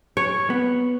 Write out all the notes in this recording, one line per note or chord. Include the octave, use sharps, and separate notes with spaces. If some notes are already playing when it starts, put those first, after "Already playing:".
C#5
B3